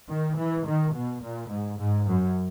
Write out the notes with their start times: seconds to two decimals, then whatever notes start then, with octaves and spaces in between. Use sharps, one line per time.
0.09 D#3
0.37 E3
0.66 D#3
0.94 B2
1.22 A#2
1.50 G#2
1.79 G#2
2.07 F#2